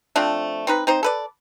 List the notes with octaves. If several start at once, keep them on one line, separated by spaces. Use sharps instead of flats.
F3 A3 C4 D4
C4 D#4 B4
C4 D#4 C5
A4 B4 D5